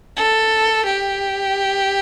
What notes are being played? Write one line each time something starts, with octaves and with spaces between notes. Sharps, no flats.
A4
G4